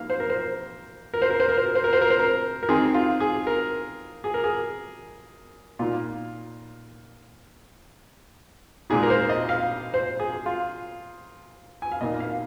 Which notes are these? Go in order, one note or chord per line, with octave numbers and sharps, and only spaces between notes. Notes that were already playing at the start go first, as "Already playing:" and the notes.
Already playing: F3 A#3 D#4 F5
C5
A#4
C5
A#4
C5
A#4
C5
A#4
C5
A#4
C5
A#4
C5
A#4
C5
A#4
A#4
D#3 C4 D#4 G#4
F4
G#4
A#4
G#4
A#4
G#4
A#2 A#3 D#4 F4
A#2 G#3 D#4 G#4
A#4
C5
D#5
F5
C5
G#4
F4
G#5
F5
A#2 A#3 D#4 D#5
F5